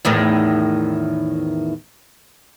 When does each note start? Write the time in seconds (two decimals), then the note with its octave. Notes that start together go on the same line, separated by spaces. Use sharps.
0.05 E2 A2 D#3